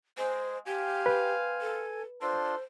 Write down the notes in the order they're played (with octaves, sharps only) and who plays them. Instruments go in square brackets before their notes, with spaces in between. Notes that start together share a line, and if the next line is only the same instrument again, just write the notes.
[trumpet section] G#3 [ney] C5
[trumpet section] C4 F5 [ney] G4 [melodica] G#5
[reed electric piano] B4
[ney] A4
[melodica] D4 F4 C6 [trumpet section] A4 [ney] C5